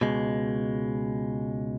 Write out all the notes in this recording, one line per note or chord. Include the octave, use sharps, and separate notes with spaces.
C#2 B2 G#3